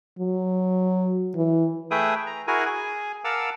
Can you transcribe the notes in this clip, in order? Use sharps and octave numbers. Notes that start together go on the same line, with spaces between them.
F#3
E3
A3 G#4 B4 E5 G5 D#6
A#5
E4 F#4 G#4 A#4 G#5
G#4 G#5
A#4 F5 F#5 A5 D6 E6